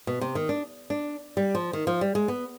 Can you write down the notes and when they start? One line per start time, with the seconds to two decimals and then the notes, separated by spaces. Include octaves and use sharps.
0.07 B2
0.21 C3
0.35 D#3
0.49 D4
0.90 D4
1.37 G3
1.55 F3
1.73 D#3
1.87 F3
2.01 G3
2.15 G#3
2.28 B3